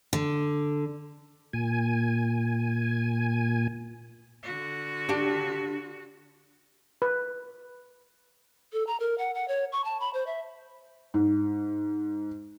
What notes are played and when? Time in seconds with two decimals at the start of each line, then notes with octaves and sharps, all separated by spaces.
0.13 D3
1.53 A#2 G#5
4.43 D3 F#4
5.09 D4 G4
7.02 B4
8.73 A4
8.87 A#5
9.00 A#4
9.18 F#5
9.34 F#5
9.48 C#5
9.72 C#6
9.84 A5
10.00 B5
10.14 C5
10.27 E5
11.14 G#2